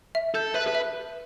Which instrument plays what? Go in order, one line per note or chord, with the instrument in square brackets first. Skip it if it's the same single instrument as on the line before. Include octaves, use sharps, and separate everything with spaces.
[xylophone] E5
[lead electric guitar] A4 [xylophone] G6
[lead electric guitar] B4 [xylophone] E5
[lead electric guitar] B4
[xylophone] E5